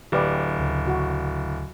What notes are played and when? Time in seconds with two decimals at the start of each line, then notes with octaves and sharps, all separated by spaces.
0.12 D1 G4 B4 D5
0.59 D2 C#3
0.87 F#4